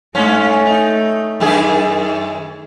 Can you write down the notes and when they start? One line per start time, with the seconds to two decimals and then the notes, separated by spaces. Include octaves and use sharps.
0.15 G2 A3 C#4
0.66 D#4
1.40 F#2 D#3 G#4